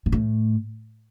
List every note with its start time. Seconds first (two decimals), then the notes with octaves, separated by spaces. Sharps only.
0.06 A#2
0.12 A2